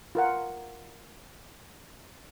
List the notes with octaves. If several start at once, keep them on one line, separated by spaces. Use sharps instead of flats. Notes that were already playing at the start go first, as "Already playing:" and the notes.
F4 A#4 F#5